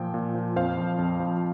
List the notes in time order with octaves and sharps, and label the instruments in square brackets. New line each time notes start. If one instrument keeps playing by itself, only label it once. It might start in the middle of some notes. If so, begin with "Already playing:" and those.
Already playing: [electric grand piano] A#2 F3 G5
A#2
F3
F2 C5 F5
F3
F2
F3